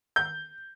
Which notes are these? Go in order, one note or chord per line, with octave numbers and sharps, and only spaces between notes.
G6